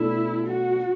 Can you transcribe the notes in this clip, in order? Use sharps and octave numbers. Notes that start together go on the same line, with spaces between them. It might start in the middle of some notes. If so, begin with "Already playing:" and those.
Already playing: B2 A3 D4 E4
F#4